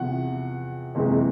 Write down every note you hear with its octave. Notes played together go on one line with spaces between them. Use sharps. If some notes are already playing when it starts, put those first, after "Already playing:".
Already playing: E2 C3 F3 F#5
F#1 F2 C3 E3 G#3